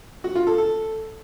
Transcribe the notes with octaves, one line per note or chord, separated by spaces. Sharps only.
F#4
F4
A4
A4